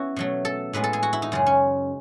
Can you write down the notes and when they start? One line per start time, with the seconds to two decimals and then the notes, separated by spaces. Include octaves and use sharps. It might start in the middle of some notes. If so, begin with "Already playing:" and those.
Already playing: B3 C#4 E4 F#4
0.16 B2 F#3 A3
0.45 A4
0.73 A2 G#3 B3 B4
0.84 A4
0.93 G#4
1.03 F#4
1.13 E4
1.22 D#4
1.32 F#2 C#3 G#3
1.46 C#4